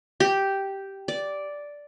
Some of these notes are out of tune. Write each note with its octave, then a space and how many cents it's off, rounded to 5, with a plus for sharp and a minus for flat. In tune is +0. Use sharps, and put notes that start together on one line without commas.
G4 -5
D5 -5